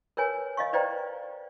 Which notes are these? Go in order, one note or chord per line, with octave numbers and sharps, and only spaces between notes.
A#4 B4 C#5 G#5
D#5 F5 C#6
B4 C5 D5 D#5 G5 A#5